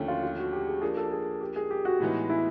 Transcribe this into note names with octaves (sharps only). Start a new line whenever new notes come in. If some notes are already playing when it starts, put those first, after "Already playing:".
Already playing: D#2 D3 F3 A3 C#4
F4
F4
F#4
G4
G#4
F3 A#3 D4 G#4
A4
G#4
G4
G#4
G4
F#4
A2 E3 G#3 B3 D#4
E4